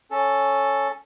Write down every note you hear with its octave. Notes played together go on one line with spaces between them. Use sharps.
C#4 A4